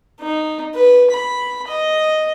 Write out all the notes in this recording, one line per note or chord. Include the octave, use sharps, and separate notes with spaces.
D#4
B4
B5
D#5